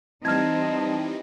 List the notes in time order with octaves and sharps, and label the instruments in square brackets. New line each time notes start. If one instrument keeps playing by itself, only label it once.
[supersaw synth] E3 G3 [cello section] C4 D#4 [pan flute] A5 [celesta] F6 G#6